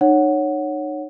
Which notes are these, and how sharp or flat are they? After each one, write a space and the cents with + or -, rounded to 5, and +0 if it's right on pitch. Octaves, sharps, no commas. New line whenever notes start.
D#4 -35 C#5 +0 F#5 +0